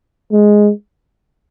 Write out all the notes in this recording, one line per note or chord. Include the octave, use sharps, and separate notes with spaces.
G#3